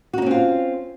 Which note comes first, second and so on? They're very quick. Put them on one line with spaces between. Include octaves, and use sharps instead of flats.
F#4 D#4 C#4 C4 F4